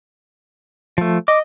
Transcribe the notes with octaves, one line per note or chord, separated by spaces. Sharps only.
F3 A3
D#5 D6